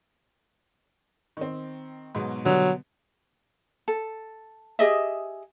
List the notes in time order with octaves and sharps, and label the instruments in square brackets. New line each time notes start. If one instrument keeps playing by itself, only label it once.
[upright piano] D#3 C4
G#2 B2 F#3
[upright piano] B2 D3 G3 [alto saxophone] F#3
[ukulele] A4
G4 G#4 D#5 E5